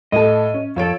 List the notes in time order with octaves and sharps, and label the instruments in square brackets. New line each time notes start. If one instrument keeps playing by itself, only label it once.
[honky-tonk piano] A2 A4 [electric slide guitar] D#5
[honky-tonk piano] C#4
[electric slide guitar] F2 A4 [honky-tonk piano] F4 C#5 D7